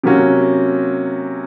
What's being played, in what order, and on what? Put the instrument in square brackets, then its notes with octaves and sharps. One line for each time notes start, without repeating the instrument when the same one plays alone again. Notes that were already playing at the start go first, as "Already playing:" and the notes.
[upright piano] C3 F#3 A#3 C#4 F#4